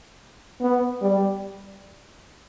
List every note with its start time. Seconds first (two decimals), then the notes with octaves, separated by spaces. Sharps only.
0.61 B3
1.02 G3